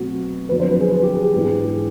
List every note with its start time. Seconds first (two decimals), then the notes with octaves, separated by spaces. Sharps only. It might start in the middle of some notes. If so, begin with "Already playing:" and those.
Already playing: B2 F#3 A3 C4 F#4
0.49 F2 D3 F#3 B3 D4 B4
0.60 C5
0.71 B4
0.81 G#4
0.92 G#4
1.03 G4
1.13 G#4
1.24 G#4
1.34 G#2 E3 G#3 B3 D4 G4
1.45 G#4